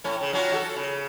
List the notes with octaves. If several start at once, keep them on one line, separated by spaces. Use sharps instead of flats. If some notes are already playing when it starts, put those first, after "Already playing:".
A2 C#4
C#3
F#3 C#4 F4
F#4 G4 A4
C#3